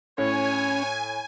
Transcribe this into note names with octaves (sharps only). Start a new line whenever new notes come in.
A2 C#4 C#5 G#5